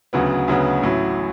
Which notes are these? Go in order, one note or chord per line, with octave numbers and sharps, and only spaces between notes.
D2 C#3 F#3 B3
D2 C#3 F#3 B3
A1 A2 F#3